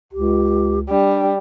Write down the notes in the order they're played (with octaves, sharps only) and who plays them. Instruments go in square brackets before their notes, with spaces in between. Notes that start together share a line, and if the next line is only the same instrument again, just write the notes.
[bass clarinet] C#2 [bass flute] G4
[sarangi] G3 [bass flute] D4